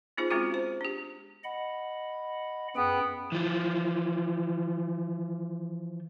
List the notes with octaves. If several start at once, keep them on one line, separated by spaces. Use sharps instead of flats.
B3 D#4 F4 G#4 C5
G#3 C4 C#4 F4 F#4
C5
D4 G4
D#5 F#5 B5
F#2 B3 G#4 G5
E3 F3